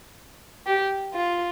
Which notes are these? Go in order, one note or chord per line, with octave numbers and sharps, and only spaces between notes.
G4
F4